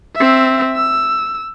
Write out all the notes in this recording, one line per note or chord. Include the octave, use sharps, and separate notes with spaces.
C4 E5
E6